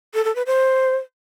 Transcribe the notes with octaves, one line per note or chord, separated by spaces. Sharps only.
A4
A4
B4
C5